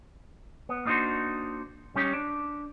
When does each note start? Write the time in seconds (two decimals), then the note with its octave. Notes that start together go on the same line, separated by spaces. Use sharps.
0.69 B3
0.85 A#3 D4 D#4 F4 F#4 C5
1.95 G3 C#4 D#4 G4
2.13 D4